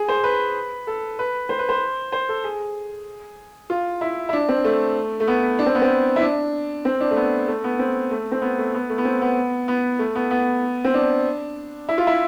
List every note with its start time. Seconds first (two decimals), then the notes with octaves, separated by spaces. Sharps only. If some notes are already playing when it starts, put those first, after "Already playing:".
Already playing: G#4
0.08 C5
0.24 B4
0.87 A4
1.19 B4
1.49 C5
1.59 B4
1.69 C5
2.12 C5
2.29 A4
2.44 G#4
3.70 F4
4.01 E4
4.29 E4
4.33 D4
4.49 C4
4.64 A3
5.20 A3
5.27 B3
5.59 D4
5.66 C4
5.75 B3
5.82 C4
6.16 E4
6.21 D4
6.85 C4
7.00 D4
7.11 A3
7.16 B3
7.48 A3
7.64 B3
7.79 C4
8.11 A3
8.32 C4
8.42 B3
8.58 A3
8.74 B3
8.90 A3
8.98 B3
9.05 C4
9.21 B3
9.68 B3
9.99 A3
10.15 B3
10.31 B3
10.84 C4
10.94 D4
11.89 E4
11.98 F4
12.07 E4